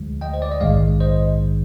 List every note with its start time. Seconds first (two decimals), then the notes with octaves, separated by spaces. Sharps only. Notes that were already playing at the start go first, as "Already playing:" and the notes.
Already playing: D2 D3 F3 G#3
0.21 D#5 G5
0.34 C5
0.42 D5
0.52 D#5
0.61 A#1 G#2 D#3 G#3 D5 F5
1.00 C5 D#5